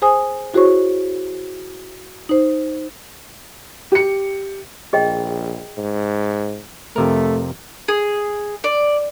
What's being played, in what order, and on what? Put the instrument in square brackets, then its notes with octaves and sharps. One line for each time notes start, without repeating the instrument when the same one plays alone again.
[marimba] G#4 C5 G#5 D#6
E4 F#4 G#4 C5 C#5 C#6
D#4 C5
[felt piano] G4 C#7
[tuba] A#1 [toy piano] G#4 D#5 G5
[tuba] G#2
[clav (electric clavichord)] F2 C3 A#4 [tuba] A3
[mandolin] G#4
D5